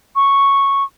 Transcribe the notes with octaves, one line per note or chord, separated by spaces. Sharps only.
C#6